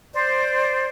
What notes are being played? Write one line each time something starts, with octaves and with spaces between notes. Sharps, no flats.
C5 D5